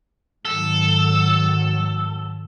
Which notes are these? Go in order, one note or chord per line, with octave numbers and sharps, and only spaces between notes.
G#2 D#3 F#3 A4